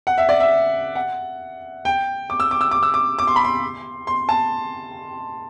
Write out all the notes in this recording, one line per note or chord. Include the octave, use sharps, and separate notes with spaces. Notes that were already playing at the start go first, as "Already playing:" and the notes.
F#5
E5
D5
E5
F#5
G5
D6
E6
D6
E6
D6
E6
D6
D6
C6
B5
C6
C6
A5